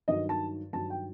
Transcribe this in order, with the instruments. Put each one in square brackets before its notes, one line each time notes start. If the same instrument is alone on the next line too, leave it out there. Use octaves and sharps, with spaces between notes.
[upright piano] G2 D#3 F#3 D#5
A5
G2 D#3 F#3 A5
G5